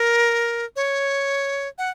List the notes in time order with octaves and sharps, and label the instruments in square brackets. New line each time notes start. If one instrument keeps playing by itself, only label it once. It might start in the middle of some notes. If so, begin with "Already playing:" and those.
Already playing: [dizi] A#4
C#5
F#5